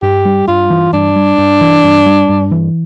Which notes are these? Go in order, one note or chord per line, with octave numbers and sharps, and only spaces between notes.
G2 G4
G3
G2 F4
E3
G2 D4
G3
G2
E3
G2
G3
G2
E3